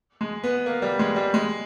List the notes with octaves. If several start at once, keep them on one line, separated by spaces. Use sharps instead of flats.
G#3
B3
A#3
G3
G#3
G3
G#3